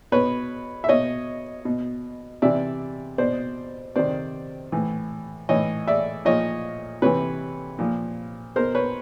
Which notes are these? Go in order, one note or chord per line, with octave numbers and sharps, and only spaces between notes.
B2 B4 C#5
E5
B2 C#5 D#5
B2
C3 E3 D5 E5
B2 C5 D5
C3 D#3 C5 D5
A2 E3
A2 E3 C#5 D#5
D5 E5
A#2 F3 C#5 D#5
C3 E3 B4 C#5
A#2 F3
B2 A#4 C5
B4 C#5